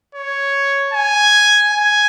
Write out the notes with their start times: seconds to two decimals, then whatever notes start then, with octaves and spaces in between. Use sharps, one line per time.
0.15 C#5
0.93 G#5
1.72 G#5